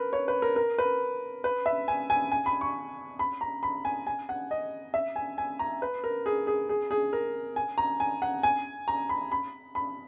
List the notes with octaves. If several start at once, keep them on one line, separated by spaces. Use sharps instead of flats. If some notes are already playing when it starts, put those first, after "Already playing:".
Already playing: A#4 B4
C#5
B4
A#4
A#4
B4
B4
E5
G#5
G#5
G#5
B5
C#6
B5
A#5
B5
G#5
G#5
F#5
D#5
E5
G#5
G#5
A#5
B4
A#4
G#4
G#4
G#4
G#4
A#4
G#5
A#5
G#5
F#5
G#5
A#5
B5
B5
B5